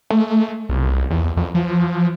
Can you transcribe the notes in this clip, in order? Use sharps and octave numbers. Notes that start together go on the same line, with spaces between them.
A3
C2
E2
F2
F3